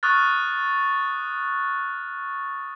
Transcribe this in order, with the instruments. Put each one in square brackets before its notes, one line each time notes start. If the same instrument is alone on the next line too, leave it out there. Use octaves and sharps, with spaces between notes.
[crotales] C#6 D#6 F6 F#6 A6